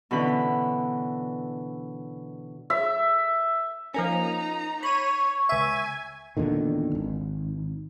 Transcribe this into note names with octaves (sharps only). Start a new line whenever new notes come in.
B2 D3 E3 C#4 B5
E5
F3 A#3 C#4 D#4 A#5
C#5 B5 C#6 D#7
C#2 E5 G#5
E2 A#2 D3 D#3
G#1